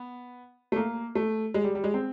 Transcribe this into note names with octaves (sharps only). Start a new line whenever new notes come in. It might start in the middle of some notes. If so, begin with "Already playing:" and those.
Already playing: B3
A3
A#3
A3
G#3
G3
G3
G#3
C4